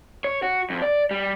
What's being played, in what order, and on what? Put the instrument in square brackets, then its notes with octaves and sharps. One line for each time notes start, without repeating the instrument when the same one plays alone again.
[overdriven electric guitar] C#5
F#4
F2
D5
G3